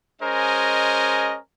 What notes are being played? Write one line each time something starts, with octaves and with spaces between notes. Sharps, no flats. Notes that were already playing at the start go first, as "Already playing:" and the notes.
G#3 C#4 A#4 C5 D#5 G#5